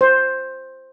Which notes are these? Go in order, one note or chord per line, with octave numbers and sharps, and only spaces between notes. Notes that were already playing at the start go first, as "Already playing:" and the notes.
C5